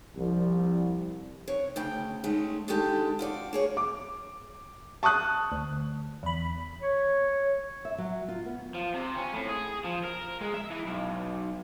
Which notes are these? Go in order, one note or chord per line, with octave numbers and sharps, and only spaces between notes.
C2 F3
C3 C#5
D2 C#3 G5
D#3 G#3 A3 C#4
D3 D#3 G#3 D4 G4 A4
F4 F#4 D5
A#3 G#4 C#5
D6
A5 C#6 D#6 F#6
D2
E2 B5
C#5
E5
F#3
F4
B3
F3
C3
C#4
A2
G#4
F3
A#4
G#3
E5
E3
B1